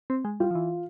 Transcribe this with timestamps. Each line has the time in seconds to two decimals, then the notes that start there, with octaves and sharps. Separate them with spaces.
0.10 C4
0.25 G#3
0.40 G3 F4
0.51 F3
0.55 E3